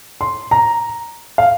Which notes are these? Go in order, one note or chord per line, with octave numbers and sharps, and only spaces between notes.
C6
A#5
F5